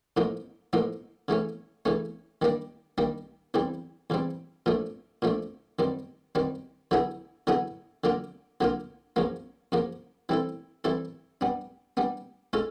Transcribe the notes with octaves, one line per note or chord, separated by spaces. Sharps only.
A2 F3 A#3 D#4
A2 F3 A#3 D#4
C#3 E3 A3 C#4
C#3 E3 A3 C#4
D#3 G3 A#3 D4
D#3 G3 A#3 D4
E2 C#3 E3 G3 C4
E2 C#3 E3 G3 C4
A#2 F3 A3 D4
A#2 F3 A3 D4
F#2 D#3 G3 C4
F#2 D#3 G3 C4
D3 F#3 B3 E4 G#4
D3 F#3 B3 E4 G#4
D3 F#3 A#3 D4 F4
D3 F#3 A#3 D4 F4
F#2 C#3 F3 A#3
F#2 C#3 F3 A#3
E3 G3 C4 E4 A4
E3 G3 C4 E4 A4
G3 B3 D4
G3 B3 D4
G#3 C#4 F4 A4 C#5